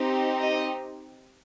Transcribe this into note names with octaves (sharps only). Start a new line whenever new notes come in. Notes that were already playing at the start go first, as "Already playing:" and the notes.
Already playing: C4 D#4 G4
D#5